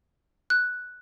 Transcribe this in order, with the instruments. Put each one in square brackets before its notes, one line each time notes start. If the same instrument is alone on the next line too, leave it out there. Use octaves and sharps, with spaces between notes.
[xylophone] F#6